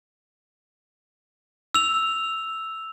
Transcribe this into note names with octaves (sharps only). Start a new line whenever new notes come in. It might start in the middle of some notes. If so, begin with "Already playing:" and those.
E6 F7